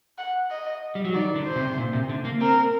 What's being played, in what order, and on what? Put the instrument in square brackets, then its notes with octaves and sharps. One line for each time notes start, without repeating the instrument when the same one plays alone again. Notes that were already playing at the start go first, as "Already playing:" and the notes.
[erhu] F#5
D#5
[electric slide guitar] G3
F#3
[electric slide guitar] D#3 [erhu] D5
[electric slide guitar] D3
[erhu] C5
[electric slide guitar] C3
A#2
C3
D3
A#3
[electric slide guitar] C4 [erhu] A#4